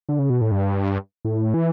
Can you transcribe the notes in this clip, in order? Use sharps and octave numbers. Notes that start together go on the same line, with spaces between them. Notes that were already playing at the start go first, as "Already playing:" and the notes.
D3
C#3
B2
A2
G2
A2
E3